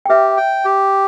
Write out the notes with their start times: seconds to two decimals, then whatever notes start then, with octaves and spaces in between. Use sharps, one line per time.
0.06 G5
0.09 G4 B4 E5
0.37 G5
0.65 G4